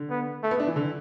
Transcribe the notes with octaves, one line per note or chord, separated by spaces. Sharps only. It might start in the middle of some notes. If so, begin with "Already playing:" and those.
Already playing: D3
B3
A3
B3
D4
E3
D3